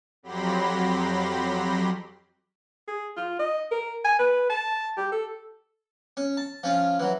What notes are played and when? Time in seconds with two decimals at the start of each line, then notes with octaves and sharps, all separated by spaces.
0.23 F2 F#3 G4 B5 C6 A#6
2.88 G#4
3.17 F4
3.39 D#5
3.71 A#4
4.05 G#5
4.19 B4
4.49 A5
4.97 G4
5.12 A4
6.17 C#4
6.37 A5
6.63 F3 C#4 F4
6.99 E3 F#3